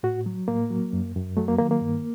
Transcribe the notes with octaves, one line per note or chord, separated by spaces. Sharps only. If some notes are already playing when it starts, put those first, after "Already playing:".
A2 F#4
F#3
A2 A#3
F#3
F#2
F#2
F#3 A3
A#3
D#3 A#3
A#3
G2